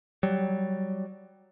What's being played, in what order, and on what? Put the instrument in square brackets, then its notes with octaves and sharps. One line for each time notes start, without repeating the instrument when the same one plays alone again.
[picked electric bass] F#3 G3